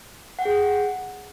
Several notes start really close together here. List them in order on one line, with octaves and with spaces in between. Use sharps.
F#5 G5 G#4